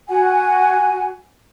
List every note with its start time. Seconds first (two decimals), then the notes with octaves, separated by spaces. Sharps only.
0.08 F#4 F#5 G#5